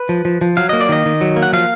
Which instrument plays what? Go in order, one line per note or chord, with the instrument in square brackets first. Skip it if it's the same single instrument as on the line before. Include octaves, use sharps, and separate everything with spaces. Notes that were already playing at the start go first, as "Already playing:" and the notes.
Already playing: [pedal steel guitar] B4
F3
F3
F3
F#3 F5
A#3 D#5
D5
D#3 D#5
D#3
F#3
A#3
F#5
F3 F5